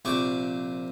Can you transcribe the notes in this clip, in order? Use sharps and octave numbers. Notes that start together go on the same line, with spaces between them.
A#1 C3 C#6 D6